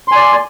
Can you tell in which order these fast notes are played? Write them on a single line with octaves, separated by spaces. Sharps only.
C6 G#5 D5